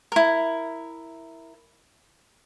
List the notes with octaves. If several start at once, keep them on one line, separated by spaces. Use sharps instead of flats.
E4 A#4